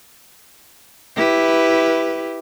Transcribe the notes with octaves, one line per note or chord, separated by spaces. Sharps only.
E4 G4 B4